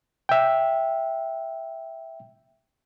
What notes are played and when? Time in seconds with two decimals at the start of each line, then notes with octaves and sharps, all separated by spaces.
0.29 E5 G5